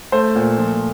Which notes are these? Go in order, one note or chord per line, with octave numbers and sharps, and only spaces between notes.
A3 C5
A#2
F3